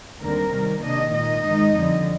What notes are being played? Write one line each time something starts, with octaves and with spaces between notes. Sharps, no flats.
D#2 D3 G3 C4 A#4
C3 D#3 G3
C3 D#3 A#3 D4 D#5
A#2 G#3 D#4 D#5
G#2 D#3 G#3 D#4
F2 D3 G3